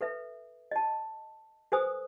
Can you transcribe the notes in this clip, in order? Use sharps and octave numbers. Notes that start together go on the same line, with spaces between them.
A4 B4 E5
D#5 A5
A4 B4 C5 G#5 D#6 E6